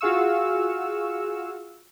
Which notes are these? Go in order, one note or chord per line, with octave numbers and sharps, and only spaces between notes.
F4 F#4 G#4 F5 C#6 E6